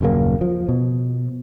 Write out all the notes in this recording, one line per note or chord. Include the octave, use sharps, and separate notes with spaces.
D#1 F#2 C#3 A#3
F3
B2